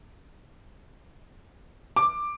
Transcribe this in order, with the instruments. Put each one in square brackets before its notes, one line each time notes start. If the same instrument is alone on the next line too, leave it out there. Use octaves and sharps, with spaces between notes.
[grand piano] D6